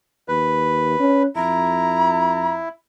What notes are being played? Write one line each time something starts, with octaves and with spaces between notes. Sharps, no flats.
D#2 B4
C#4
F2 E4 A#5